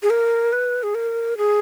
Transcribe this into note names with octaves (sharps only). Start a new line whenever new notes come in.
G#4
A#4
B4
G#4
A#4
G#4